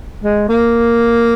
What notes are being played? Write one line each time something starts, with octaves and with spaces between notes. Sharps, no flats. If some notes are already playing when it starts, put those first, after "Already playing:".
G#3
A#3